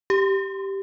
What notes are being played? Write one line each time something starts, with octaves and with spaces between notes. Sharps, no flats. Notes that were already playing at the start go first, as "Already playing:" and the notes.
G4